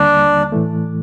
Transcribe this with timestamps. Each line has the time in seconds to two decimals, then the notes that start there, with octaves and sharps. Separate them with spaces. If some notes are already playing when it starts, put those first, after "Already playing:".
Already playing: D#2 D3 G3 A#3 D4
0.52 A2 E3 A3